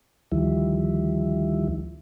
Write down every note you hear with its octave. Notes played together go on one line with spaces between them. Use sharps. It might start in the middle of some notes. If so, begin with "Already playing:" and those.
D2 D#3 F3 G3 E4